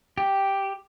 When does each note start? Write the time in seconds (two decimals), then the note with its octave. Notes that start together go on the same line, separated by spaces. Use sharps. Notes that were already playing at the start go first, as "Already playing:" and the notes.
0.18 G4